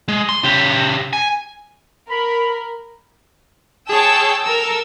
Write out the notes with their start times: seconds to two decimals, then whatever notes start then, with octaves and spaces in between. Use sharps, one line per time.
0.08 G#3
0.29 C6
0.44 C#3 G4
1.13 G#5
2.10 A#4 B5
3.89 G#4 C#5 G5 A5 E6
4.44 A4 A#4 E6